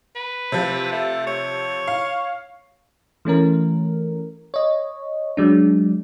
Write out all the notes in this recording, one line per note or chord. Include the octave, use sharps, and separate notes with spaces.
B4
C3 F3
A3
C#5
F5
E3 A3 C#4 A#4
C#5 D#5
F#3 G#3 D4